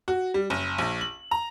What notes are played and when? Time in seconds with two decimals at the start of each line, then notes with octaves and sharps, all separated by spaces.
0.08 F#4
0.34 G3
0.50 F#1
0.78 A#1
1.01 F#7
1.31 A#5